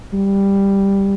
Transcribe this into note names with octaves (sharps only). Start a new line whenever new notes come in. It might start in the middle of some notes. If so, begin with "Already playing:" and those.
G3